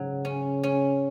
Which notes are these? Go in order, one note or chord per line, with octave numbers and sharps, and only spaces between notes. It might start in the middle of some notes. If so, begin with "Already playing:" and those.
Already playing: G#2 C#3 F#3
C#4
C#4